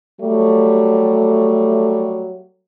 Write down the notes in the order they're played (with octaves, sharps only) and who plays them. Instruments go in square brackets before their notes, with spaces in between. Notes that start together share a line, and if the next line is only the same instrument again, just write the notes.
[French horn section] F#3 G3 A3